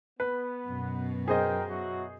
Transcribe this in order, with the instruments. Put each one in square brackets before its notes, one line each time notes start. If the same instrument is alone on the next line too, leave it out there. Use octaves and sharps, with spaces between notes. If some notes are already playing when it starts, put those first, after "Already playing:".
[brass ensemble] B3 [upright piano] B4
[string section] F#2 B2
[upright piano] G#4 C5 D#5 [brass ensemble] A#4 G5
[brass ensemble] F#3 E4 F#4